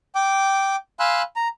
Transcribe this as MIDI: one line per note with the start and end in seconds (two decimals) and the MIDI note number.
0.15 0.76 79
0.15 0.76 86
1.00 1.22 77
1.00 1.22 80
1.00 1.22 83
1.00 1.22 84
1.00 1.22 88
1.00 1.22 90
1.36 1.48 82